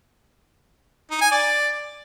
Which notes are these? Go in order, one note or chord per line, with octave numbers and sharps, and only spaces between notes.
D#4
G#5
D5